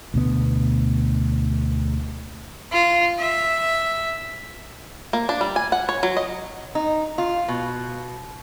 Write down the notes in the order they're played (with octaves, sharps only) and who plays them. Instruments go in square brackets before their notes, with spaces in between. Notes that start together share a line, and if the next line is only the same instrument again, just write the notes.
[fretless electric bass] D2 B2 B3
[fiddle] F4
E5
[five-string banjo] A#3
D4
G3
G#5
F#5
C#5
F#3
D#5
[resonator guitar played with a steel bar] D#4
F4
B2